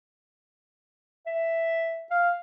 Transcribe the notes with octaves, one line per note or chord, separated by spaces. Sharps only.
E5
F5